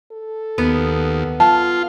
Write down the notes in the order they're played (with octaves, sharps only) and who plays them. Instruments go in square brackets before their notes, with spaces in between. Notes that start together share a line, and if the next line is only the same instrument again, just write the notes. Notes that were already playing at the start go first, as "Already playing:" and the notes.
[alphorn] A4
[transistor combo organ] D#2 [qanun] B3
[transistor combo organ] F4 [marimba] A5